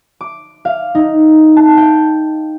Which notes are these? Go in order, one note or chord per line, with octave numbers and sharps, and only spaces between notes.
D6
F5
D#4
A5
G5